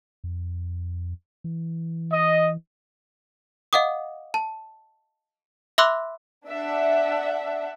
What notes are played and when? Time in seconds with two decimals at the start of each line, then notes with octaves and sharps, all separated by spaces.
0.24 F2
1.44 E3
2.13 D#5
3.73 D#5 F5 F#5 D6 D#6
4.34 A5
5.78 E5 B5 C6 D6 E6 F#6
6.47 D4 E5 F#5